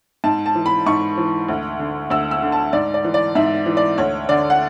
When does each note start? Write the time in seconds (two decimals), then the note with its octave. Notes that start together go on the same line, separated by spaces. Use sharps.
0.24 G#2 A5
0.46 A5
0.55 E3
0.66 B5
0.86 G#2 C#6
1.18 E3
1.48 D2
1.79 D3
2.10 D2 E6
2.31 E6
2.42 D3
2.52 A5
2.73 G#2 D5
2.94 D5
3.04 E3
3.14 D5
3.35 G#2 E5
3.66 E3
3.77 D5
3.98 D2 C#5
4.29 D3 D5
4.50 F#5